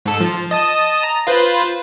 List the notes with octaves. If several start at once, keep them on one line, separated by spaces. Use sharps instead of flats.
G#2 A4
F3
D#5 A5 D#6
A#5
F4 B4 C5